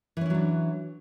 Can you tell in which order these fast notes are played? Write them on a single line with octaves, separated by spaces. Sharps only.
E3 C#4 E4 F#3 D4